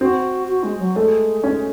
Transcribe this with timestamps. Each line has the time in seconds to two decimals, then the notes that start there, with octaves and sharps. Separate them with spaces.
0.01 C4 F#4
0.48 F#4
0.64 G#3
0.79 F#3
0.96 G#3 A3
1.44 C#4